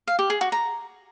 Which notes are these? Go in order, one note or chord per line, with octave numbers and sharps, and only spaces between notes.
F5
G4
G#4
F#4
A#5